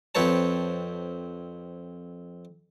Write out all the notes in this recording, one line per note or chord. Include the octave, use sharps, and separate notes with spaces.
F2 C4 B4 C#5 A5